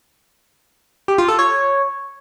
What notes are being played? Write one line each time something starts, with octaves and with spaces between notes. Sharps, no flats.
G4
F4
A4
C#5